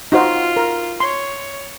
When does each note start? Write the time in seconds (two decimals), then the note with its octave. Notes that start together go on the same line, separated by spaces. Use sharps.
0.12 D#4 F4 F#4 C5
0.57 A#4
1.00 C#5 C6